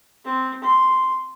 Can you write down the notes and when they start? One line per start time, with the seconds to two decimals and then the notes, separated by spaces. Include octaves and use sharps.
0.24 C4
0.63 C6